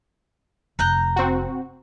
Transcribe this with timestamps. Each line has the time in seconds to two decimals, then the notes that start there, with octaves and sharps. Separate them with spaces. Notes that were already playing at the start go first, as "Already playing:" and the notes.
0.79 F1 A#5 F#6 G6
1.16 C4 F#4